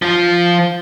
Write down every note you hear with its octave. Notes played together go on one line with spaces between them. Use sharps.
F3 F4